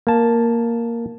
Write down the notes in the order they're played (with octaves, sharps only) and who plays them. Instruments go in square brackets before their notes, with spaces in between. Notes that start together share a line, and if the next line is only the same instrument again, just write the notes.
[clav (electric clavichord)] A#3 A5